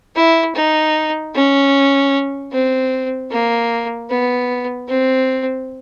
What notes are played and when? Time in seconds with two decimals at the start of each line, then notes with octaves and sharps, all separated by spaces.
0.16 E4
0.55 D#4
1.34 C#4
2.52 C4
3.31 A#3
4.10 B3
4.89 C4